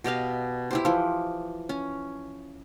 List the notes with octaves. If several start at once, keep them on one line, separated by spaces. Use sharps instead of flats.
B2 G4 D#5 F5
E4 G4 C5
E3 F3
C#4